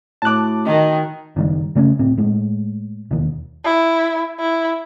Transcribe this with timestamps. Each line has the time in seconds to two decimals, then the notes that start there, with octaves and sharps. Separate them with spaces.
0.22 A2 F#4 A5 D6 F#6
0.66 D#3 D#4 F#4 D#5 G5
1.36 F#1 D#3 G3
1.75 C#3 A3 A#3 C#4
1.99 D1 A2 C4
2.17 A2 G#3
3.11 E1 D#2
3.65 E4
4.40 E4